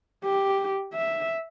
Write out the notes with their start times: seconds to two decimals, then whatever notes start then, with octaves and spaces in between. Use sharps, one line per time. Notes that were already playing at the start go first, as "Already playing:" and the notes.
0.24 G4
0.93 E5